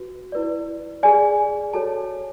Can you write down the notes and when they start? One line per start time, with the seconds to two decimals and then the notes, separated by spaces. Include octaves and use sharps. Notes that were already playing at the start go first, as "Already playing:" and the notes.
Already playing: F#4 B4
0.32 E4 B4 D5
1.03 G#4 D5 G#5
1.74 F#4 A4 C#5 A5